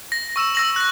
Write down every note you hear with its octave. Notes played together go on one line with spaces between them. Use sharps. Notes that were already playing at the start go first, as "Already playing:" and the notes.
A#6
C#6 E6 E7
E6 A#6 F#7
F#6 A#6